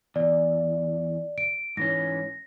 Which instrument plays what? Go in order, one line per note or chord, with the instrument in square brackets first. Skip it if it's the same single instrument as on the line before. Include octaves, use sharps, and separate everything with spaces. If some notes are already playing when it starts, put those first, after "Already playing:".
[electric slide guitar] E2 [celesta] D5
[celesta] D7
[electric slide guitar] G#2 E3 C#4 [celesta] A#6